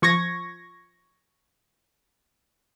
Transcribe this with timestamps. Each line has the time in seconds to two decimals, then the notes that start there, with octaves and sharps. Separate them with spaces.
0.02 F3 C#6 G#6 A#6